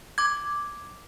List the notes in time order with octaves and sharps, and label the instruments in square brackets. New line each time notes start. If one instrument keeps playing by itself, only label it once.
[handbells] D6 G#6